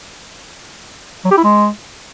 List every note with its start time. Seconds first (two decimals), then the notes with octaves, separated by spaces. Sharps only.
1.25 F#3
1.31 G4
1.37 E4
1.44 G#3